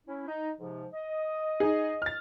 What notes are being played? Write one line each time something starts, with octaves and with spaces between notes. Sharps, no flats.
C#4 E4
D#4
G#2 C3 F3
D#5
D#4 G#4
F6 A6